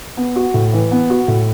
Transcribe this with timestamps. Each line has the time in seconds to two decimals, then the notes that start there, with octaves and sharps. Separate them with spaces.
0.17 B3
0.36 F#4
0.54 A2
0.73 E3
0.91 B3
1.10 F#4
1.28 A2